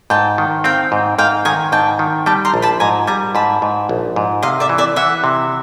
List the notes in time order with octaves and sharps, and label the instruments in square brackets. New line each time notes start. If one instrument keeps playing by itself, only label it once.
[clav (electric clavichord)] G#2 [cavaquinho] G5 A5
[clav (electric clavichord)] D#3
[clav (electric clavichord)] C4 [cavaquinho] F5 G5
[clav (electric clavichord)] G#2
[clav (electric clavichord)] G#2 [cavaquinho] F5 G5
[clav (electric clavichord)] D#3 [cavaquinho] G#5 A#5
[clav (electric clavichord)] G#2 [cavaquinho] G5 A5
[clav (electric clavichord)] D#3
[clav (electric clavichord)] G3 [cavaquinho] G5 A5
[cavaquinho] A#5 C6
[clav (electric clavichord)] A#1
[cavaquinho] A5 B5
[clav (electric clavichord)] G#2 [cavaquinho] G#5 A#5
[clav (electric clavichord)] G3 [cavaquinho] G#5 A#5
[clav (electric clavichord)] G#2 [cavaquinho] A5 B5
[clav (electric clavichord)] G#2
A#1
G#2
[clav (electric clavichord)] C3 [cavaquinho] D#5 F5
[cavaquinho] D5 E5
[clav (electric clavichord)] E3
[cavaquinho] D5 E5
[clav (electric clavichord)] E3 [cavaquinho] E5 F#5
[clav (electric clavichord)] C3